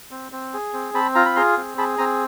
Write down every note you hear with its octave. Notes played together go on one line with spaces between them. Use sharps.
C4
C4
G#4
C4
C4 A5 B5
F4 A#5
B5
G#4 A#5 C6
C4
G#4 A5 B5
C4 G#5 A#5